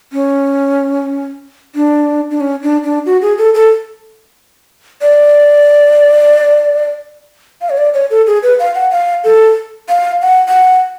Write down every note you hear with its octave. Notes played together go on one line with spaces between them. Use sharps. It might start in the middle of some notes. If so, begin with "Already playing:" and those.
C#4
D4
D4
C#4
D4
D4
F#4
G#4
A4
A4
D5
F5
C#5
D5
C#5
A4
G#4
B4
F5
F#5
F5
A4
F5
F#5
F#5